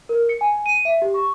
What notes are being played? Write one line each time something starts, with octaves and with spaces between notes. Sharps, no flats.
A#4
C#7
G#5
D#7
E5
G4
C#6